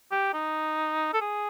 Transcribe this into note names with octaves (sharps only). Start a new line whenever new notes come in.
G4
D#4
A4
G#4